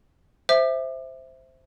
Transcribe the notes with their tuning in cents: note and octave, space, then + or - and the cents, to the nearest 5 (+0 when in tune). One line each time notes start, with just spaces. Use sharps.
C5 +0 E5 +0 D6 +35